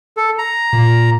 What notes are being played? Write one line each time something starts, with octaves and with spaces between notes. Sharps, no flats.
A4
A#5
A#2